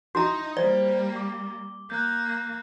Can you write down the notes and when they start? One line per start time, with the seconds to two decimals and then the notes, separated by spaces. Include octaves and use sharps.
0.15 D#4 E4 F#4 A#5 G6
0.57 G3 A#3 C5 D5 G7
1.16 D6
1.90 A#3 F#6 G6